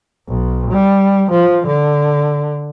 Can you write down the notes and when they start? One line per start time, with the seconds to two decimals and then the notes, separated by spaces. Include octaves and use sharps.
0.28 B1
0.70 G3
1.31 F3
1.67 D3